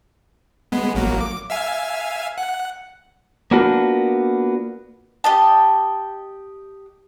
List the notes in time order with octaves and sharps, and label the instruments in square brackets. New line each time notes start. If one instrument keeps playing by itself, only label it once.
[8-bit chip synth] G#3 B3
A1 F#3 A#3
D6
E5 F5 G#5
F#5
[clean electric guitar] A#3 B3 D4 F4 F#4
[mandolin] G4 D#5 A5